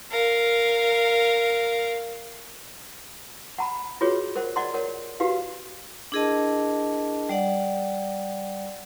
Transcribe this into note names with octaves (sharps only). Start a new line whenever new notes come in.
A#4 F5
F#5 A#5 B5
F4 F#4 G#4 B4 C#5
A#4 C5 F#5
D5 D#5 F#5 A#5 C6
A#4 C#5 F#5
F#4 G4 B4 F5
D4 E4 G#4 A#4 D#5 A5
G3 D5 F#5